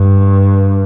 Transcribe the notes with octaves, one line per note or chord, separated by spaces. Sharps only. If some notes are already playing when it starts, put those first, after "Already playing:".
Already playing: G2